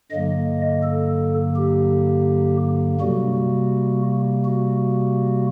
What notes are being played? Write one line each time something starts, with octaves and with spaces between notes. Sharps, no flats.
G2 D3 F#3 A#3 D#5
A4
G4
C3 G3 A#3 F#4
F#4